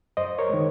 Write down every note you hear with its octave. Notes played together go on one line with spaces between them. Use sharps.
F#2 C5 D#5
A#4 C#5
D#3 G#3